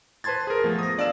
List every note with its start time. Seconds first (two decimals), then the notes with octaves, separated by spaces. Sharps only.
0.24 B4 C5 A5 C6 G#6 A6
0.47 G#4 A#4
0.64 F3 A3 B3
0.79 D#6 A#6
0.98 D4 D5 F5 A5 E6 E7